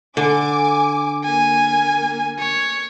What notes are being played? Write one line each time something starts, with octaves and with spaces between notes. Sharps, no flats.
D3 G#5 D6
A#3 G#5
C#5